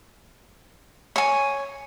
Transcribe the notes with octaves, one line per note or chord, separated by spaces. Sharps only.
C#5 G#5